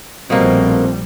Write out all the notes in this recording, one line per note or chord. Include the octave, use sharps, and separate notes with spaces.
A#1 B2 F3 G3 A3 A#3 C4